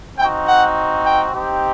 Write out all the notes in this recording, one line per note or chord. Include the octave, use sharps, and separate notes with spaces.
C4 D#4 F#4 G5
F#5
G5
C4 D#4 G4